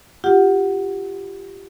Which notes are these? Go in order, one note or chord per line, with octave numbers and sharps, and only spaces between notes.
F4 G4 F#5